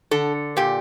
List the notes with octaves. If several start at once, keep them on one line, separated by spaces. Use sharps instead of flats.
D3 A4
A#2 G4